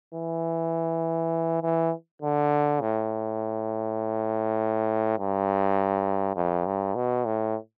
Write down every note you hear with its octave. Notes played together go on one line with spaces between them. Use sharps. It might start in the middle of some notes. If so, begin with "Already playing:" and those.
E3
E3
D3
A2
G2
F2
G2
B2
A2